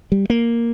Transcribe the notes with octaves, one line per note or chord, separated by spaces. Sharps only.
G3
A#3